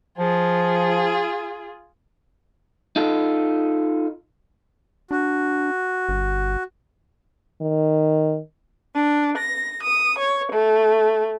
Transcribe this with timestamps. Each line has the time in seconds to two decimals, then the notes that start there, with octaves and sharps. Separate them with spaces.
0.18 F3 F4 G#4
2.96 D#4 F4 A4
5.11 D4 F#4
6.09 G1
7.61 D#3
8.94 D4
9.37 A#6
9.82 D#6
10.18 C#5
10.52 A3